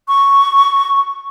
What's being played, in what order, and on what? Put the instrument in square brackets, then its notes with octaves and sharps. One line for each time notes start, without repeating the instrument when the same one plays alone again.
[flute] C#6